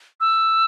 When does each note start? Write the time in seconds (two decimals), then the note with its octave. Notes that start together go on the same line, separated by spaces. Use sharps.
0.21 E6